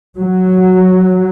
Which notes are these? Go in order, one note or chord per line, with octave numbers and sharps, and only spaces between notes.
F#3